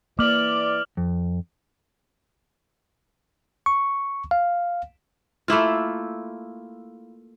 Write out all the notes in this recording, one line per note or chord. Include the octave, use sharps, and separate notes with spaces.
E3 A#3 D5 D6 F6 F#7
F2
C#6
F5
A3 A#3 E4 F4